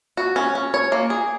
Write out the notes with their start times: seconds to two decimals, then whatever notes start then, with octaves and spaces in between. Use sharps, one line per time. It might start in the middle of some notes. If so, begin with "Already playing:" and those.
0.17 F#4
0.36 C#4
0.55 C#4
0.74 C#5
0.92 A#3
1.10 G#4